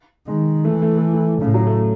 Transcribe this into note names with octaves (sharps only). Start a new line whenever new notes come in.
D#3 G#3
E3 A3
A3
A3
A3
A2 C#3
F#3
A3